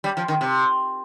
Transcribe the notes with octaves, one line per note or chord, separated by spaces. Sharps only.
G3
F3
D#3
C3